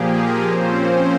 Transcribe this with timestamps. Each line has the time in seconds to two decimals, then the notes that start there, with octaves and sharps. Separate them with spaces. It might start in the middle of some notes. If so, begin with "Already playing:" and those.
Already playing: A#2 F3 A#3 G4 G#4
0.14 A#3 A#4
0.42 F3 A#3 C4 C#4 C5
0.86 C4 C5